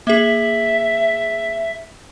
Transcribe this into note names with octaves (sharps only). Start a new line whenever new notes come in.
A#3 G#4 E5